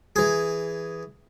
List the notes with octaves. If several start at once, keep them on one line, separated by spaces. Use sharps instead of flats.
E3 G#4